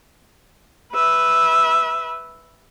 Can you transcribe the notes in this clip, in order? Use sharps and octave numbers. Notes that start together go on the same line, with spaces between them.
B4 E5